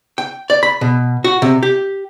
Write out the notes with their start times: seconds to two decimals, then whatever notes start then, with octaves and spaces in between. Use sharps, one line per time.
0.18 G5
0.50 D5
0.63 B5
0.81 B2
1.24 F#4
1.42 C3
1.63 G4